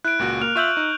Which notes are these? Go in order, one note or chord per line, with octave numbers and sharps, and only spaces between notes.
E4 F#6 D7
C#2 A#2 F#4
A#3 F6 F7
F4 E5 C#6 E6 G6 F#7
D#4